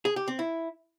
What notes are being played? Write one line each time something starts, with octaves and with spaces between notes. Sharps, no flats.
G#4
G4
C4
E4